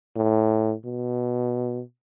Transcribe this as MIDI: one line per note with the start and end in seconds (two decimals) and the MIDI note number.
0.16 0.74 45
0.85 1.81 47